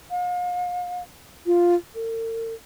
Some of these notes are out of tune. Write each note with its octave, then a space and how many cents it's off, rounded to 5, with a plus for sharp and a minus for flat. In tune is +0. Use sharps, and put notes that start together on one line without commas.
F5 +40
F4 +0
A#4 -45